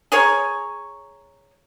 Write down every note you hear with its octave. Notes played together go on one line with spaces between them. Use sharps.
G#4 A#4 C#5